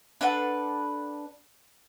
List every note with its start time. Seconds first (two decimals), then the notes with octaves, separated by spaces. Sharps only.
0.21 D4 A4 B4 F#5